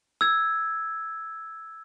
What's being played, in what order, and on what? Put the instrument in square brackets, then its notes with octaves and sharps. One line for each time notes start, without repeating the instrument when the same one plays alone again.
[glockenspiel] E6 G#6